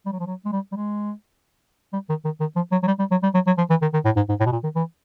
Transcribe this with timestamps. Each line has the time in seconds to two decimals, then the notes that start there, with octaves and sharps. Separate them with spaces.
0.06 G3
0.12 F#3
0.19 F3
0.26 F#3
0.45 G#3
0.52 G3
0.72 G3
0.76 G#3
1.93 G3
2.09 D#3
2.25 D#3
2.40 D#3
2.56 F3
2.72 F#3
2.83 F#3
2.87 G3
2.99 G3
3.11 F#3
3.23 G3
3.34 F#3
3.47 F#3
3.58 F3
3.70 E3
3.82 D#3
3.93 D#3
4.05 A2
4.16 G#2
4.29 G#2
4.40 A2
4.46 B2
4.52 A#2
4.63 D#3
4.75 E3